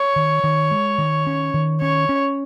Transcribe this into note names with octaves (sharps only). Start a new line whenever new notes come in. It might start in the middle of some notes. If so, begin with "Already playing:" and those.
Already playing: C#5
D#3
D#3
G#3
D#3
C#4
D#3
C#4 C#5
C#4